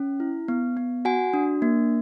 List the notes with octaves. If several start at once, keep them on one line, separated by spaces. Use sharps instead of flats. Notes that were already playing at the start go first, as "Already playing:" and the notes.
Already playing: C#4
E4
B3
B3
F#4 F#5 G#5
D4
A#3